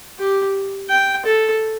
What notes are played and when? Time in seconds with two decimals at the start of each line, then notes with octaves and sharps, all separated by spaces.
0.19 G4
0.90 G5
1.26 A4